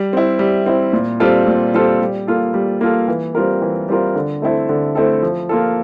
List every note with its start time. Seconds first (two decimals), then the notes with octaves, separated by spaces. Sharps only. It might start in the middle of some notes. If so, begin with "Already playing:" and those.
Already playing: G3
0.13 C4 E4
0.39 G3
0.66 C4 E4
0.93 A#2
1.20 G3 C4 F4 A4
1.47 A#2
1.74 G3 C4 F4 A4
2.01 G3
2.27 A#3 F4 A4
2.54 G3
2.81 A#3 F4 A4
3.08 E3
3.35 G3 C4 F4 A#4
3.62 E3
3.89 G3 C4 F4 A#4
4.15 D3
4.42 A3 C4 E4 A4
4.69 D3
4.95 A3 C4 E4 A4
5.22 F3
5.49 A#3 F4 A4